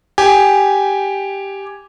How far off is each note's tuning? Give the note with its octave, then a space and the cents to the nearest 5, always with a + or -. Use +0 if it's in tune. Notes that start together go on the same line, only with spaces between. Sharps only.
G4 +0 G#5 +0